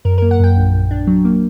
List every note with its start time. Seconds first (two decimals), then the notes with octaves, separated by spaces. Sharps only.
0.05 F#2 A#4
0.18 A#4
0.22 A#3
0.31 F#5
0.40 F#2 G5
0.57 A#1
0.73 A#1
0.91 D4
1.07 F#3
1.25 A#3